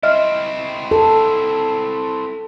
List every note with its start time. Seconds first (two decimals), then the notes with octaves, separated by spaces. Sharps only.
0.03 C4 E4 D#5 E5 F6
0.91 A4